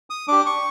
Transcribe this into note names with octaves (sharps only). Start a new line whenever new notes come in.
D#6
D4 G4 D6
C#6